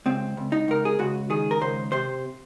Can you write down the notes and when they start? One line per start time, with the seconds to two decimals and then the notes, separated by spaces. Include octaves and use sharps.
0.06 C#2 C4
0.37 C#2
0.52 D#4
0.68 C#2 A#4
0.85 G#4
0.99 C#2 F#4
1.30 D#3 G#4
1.51 A#4
1.61 C#2 C5
1.92 C3 C5